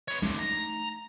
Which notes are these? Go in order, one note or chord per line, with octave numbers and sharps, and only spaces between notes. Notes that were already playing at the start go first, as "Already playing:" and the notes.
B3 C#5
G#3 A3 D4 D#4
A#5